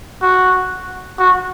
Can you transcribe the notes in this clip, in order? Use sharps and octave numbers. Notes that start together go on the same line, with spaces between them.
F#4
F#4